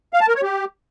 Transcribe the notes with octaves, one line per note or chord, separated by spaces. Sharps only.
F5
A5
A#4
C#5
G4